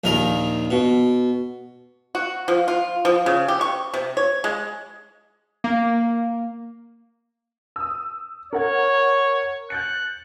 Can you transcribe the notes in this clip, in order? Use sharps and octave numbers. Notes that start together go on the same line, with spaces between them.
A#1 D#2 D#3 A#4
B2
F#4
F3
F4
F3
C#3
G4
C#6
C3
C#5
G#3
A#3
D#6 E6
A#4 C#5 F#5 G#6
F#6 G6 A6 C#7